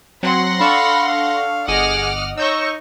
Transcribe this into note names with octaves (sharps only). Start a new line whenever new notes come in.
F#3 C4 F#5 C6 A#6
D4 A4 F5 B5 C#6
F5
G1 G#4 D#5 F#5 D6 F6 D#7
D#4 C#5 C#6 E6 G6 A#6